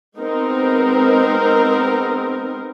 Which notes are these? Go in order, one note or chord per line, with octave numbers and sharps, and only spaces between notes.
G#3 B3 C4 D#4 A#4